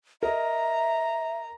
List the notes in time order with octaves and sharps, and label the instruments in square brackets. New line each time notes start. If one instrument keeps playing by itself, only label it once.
[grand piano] A#4 D#5 [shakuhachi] E5 [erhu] A#5